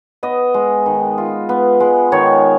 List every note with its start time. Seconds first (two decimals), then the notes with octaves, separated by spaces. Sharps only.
0.23 B3 D#5
0.54 G#3
0.86 D#3
1.18 F4
1.49 B3
1.80 G#3
2.12 D#3 C#5